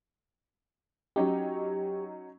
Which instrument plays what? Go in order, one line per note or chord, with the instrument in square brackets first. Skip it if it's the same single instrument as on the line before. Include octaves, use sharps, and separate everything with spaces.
[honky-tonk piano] F#3 C#4 D#4 [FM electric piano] G4